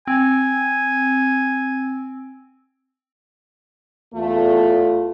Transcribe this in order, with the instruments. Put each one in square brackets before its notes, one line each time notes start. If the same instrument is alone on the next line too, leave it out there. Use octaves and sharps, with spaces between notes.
[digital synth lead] C4 [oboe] G#5
[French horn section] E2 A3 F4